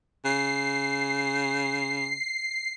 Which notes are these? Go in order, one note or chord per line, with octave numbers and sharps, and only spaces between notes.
C#3 C7